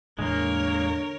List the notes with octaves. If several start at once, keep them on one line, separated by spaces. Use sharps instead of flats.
E2 A2 D3 G#3 A#3 A#4 C#5